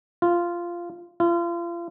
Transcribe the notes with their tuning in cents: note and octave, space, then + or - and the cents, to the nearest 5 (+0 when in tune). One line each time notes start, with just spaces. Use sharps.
F4 -10
F4 -35